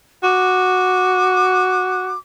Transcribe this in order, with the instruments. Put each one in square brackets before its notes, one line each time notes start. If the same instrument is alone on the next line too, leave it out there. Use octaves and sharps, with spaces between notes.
[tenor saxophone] F#4 [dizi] D6